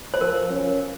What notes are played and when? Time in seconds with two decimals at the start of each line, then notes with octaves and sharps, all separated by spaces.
0.14 C5
0.21 F3 A#4
0.51 C#4